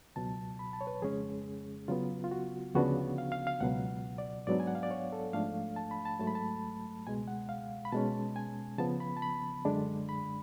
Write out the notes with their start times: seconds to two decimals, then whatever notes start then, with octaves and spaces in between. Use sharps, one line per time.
0.16 C#2 B2 F#3 A5
0.59 B5
0.73 A5
0.81 C#5
0.87 B4
1.02 F2 C#3 G#3 C#4 G#4
1.88 C#3 F#3 B3 F4
2.24 F4
2.31 F#4
2.75 D2 C#3 F3 B3 D4 F#4
3.18 F5
3.32 F5
3.47 F5
3.61 C#2 B2 F#3 F#5
4.18 D5
4.47 G#2 F#3 B3 D4 D5
4.60 G#5
4.67 F#5
4.75 F5
4.83 D5
4.91 C#5
5.12 A4
5.33 G#2 F3 A3 D4 F5
5.76 A5
5.91 B5
6.05 A5
6.19 G#2 F#3 A3 A5
6.27 B5
6.35 A5
7.06 C#2 B2 G#3 G#5
7.28 F#5
7.49 F5
7.85 B5
7.92 B2 G#3 C#4 A5
8.36 G#5
8.78 C#3 F3 B3 A5
9.00 B5
9.17 A5
9.22 B5
9.65 F#2 D3 G#3 D4
10.09 B5